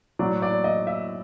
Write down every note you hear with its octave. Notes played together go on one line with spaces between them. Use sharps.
A2 F#3 D5
D5
D#5
E5